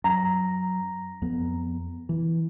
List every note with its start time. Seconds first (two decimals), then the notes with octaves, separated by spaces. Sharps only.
0.04 F#2 A#5
1.22 F2 B3
2.09 E3